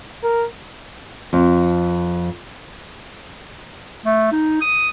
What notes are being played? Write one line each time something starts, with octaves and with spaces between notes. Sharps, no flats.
A#4
F2
A3
D#4
D#6